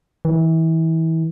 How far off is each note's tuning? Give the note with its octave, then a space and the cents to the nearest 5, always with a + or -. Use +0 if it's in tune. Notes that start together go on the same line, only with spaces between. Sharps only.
E3 -30